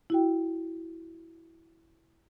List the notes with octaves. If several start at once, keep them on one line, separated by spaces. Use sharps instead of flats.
E4 F#4 G5